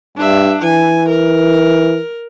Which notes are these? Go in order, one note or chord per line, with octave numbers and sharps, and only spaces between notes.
G2 D4 E5
E3 G#5
A#4